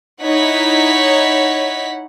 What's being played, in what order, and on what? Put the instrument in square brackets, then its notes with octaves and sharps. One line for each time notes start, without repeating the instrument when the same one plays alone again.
[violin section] D#4 E4 C#5 F#5 B6